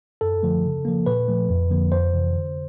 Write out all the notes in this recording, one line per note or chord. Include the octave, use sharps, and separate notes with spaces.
F#2 A4
D3 F3 A3
C#3
F3 A#3
A#2 B4
F3 A3
F2
D3 F3 A#3
F2 C5
C3 E3
D3